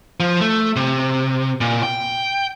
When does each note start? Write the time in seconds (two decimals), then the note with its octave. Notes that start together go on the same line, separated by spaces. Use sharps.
0.20 F3
0.41 A3
0.76 C3
1.61 A#2
1.83 G5